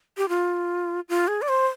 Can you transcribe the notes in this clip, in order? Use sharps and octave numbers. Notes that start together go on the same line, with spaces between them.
G4
F4
F4
G#4
D5
C5